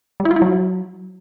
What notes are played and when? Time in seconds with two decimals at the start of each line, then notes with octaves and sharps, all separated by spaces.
0.20 G3
0.25 E4
0.31 F4
0.36 E4
0.42 F#3